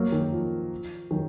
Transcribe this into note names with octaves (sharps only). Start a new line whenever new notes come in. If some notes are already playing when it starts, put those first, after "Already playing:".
Already playing: F#3 A#3
D#3
F3
D#3 F#3